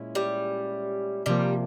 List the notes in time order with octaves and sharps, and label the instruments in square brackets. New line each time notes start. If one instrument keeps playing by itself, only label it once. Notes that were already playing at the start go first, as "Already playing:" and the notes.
Already playing: [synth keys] A#2 G#3 C#4 E4
[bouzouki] G3
[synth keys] C3 F3 A#3 [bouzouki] G3